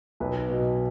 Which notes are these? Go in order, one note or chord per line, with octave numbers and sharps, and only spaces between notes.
B1 B4
B2